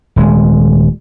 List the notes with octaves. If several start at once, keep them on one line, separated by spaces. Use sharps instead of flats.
D#1 G#3